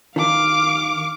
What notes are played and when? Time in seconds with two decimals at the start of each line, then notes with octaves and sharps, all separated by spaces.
0.16 D#3 F5 D6